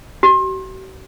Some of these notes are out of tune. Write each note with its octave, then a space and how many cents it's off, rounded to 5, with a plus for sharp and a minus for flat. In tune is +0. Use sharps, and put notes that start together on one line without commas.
F#4 +45